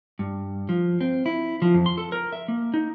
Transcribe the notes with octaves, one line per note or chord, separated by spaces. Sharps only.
G2
F3
C4
E4
F3
F2
C6
A4
A#4
E5
A#3
D#4